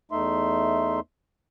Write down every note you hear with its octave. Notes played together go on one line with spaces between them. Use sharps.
E2 A3 D#4 E5 C6